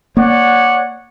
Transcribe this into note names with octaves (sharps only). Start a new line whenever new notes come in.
A#3 C#5 D5 F#5